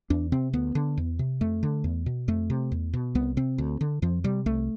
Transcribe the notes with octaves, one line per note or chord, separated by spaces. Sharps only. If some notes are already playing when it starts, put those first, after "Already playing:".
E2 D4
C3 C4
D2 B3
D3
E2
C3
F2 A3
D3
E2
B2
F2 A3
C3
E2
B2
C2 B3
C3 C4
D2
D3
F2 F3
C3 G3
C2 A3